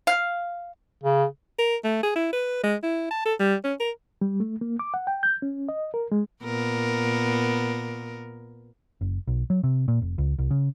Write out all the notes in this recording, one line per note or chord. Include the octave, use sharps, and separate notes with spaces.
F5
C#3
A#4
A3
G#4
E4
B4
G#3
E4
A5
A4
G3
C#4
A#4
G3
A3
A#3
D6
F#5
G5
G6
C#4
D#5
A#4
G#3
A#2 B3 A#4
F#1
B1
F#3
C3
A#2
F1
C#2
C2
C#3